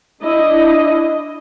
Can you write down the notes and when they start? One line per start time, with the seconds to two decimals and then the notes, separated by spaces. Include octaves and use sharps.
0.22 D4 E4 D#5